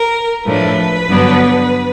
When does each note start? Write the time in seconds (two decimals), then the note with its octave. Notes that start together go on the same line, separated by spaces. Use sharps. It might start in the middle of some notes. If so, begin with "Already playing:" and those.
Already playing: A#4
0.46 A2 F3 A3 D4 B4
1.09 G2 D3 F#3 B3 D4